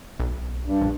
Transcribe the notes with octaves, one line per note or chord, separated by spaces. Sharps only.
B1
G2
A#1